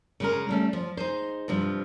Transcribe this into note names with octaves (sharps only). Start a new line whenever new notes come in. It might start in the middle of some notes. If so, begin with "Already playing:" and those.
C#3 G#3 A#4
G3 A3 C#4
F3
D#4 G#4 C5
G2 C3 F3